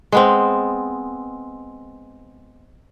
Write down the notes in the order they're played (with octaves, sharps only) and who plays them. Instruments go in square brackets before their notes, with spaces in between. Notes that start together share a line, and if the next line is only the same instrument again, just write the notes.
[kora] G#3 B3 C4